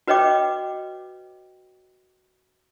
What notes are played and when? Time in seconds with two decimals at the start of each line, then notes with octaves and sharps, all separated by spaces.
0.07 F#4 B4 C#5 D#5 G5 D6